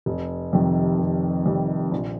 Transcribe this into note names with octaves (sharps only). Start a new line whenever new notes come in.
F1
F2 C3 D#3 G3
F1
F2 C3 D#3 G3
A#1